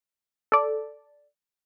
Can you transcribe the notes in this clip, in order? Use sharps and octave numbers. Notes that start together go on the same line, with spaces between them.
A4 D5